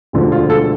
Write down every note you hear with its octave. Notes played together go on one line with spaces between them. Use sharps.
E1 D2 D3 F3
F4
A4